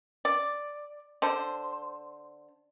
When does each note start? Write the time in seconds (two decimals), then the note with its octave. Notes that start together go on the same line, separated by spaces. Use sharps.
0.25 D5
1.22 D3 C5